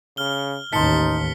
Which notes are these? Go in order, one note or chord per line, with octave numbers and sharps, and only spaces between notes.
C#3 F6 G7
A1 D#2 D#4 A5 C6 B6 C#7 G7